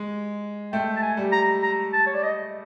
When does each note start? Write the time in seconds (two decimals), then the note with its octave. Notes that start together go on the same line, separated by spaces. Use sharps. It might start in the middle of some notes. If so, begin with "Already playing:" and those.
Already playing: G#3
0.73 A3 G5
0.96 A5
1.02 G#5
1.17 G3
1.32 A#5
1.63 A#5
1.93 A5
2.07 C#5
2.15 D5
2.23 D#5